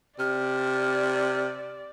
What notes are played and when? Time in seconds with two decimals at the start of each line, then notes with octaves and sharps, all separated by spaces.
0.19 C3 D5 F6